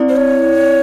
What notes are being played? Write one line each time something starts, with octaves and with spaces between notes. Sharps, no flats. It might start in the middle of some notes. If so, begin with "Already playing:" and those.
Already playing: C4 E4 D5
C5
C#5